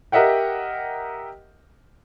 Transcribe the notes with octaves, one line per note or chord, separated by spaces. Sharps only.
G4 A#4 D#5 E5 F#5 G5